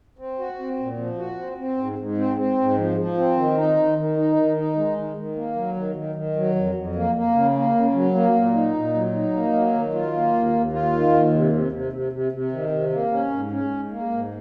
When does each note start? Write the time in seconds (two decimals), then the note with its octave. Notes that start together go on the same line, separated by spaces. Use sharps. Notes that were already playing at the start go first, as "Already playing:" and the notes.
0.19 C4
0.39 F#4
0.59 C4
0.79 A#2
0.98 F3
1.18 F#4
1.38 C4
1.58 C4
1.78 G#2
1.98 G#2
2.18 C4
2.37 C4
2.58 G#2
2.77 F3
2.98 F3
3.17 C4
3.37 D#3
3.57 D#4
3.77 D#3
3.97 D#3
4.17 D#4
4.36 D#3
4.57 D#4
4.76 G#3
4.96 D#3
5.16 D#3
5.36 A#3
5.56 F#3
5.76 D#3
5.95 D#3
6.15 D#3
6.36 F#3
6.55 F2
6.75 F2
6.95 A#3
7.15 A#3
7.35 C#3
7.55 A#3
7.74 C#3
7.94 F#3
8.14 A#3
8.34 A#2
8.54 D#4
8.74 A#2
8.94 F#3
9.13 D#4
9.33 A#3
9.53 F#3
9.73 D#3
9.93 F4
10.14 A#3
10.33 D#2
10.53 D#2
10.73 F4
10.93 D#3
11.13 D#2
11.33 C3
11.52 C3
11.72 C3
11.93 C3
12.12 C3
12.32 C3
12.52 D#3
12.72 C3
12.92 A#3
13.12 C#4
13.31 G#2
13.52 C#4
13.71 G#2
13.91 A#3
14.12 G#2